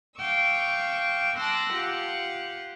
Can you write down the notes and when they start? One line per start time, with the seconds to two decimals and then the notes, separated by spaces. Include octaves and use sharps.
0.17 F5 G5 C#6 D6 E6
1.36 A5 C6 D6 E6 F#6 A#6
1.73 F4 G4 F#5